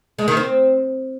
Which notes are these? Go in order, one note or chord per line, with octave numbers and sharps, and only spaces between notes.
G#3
D#3
C4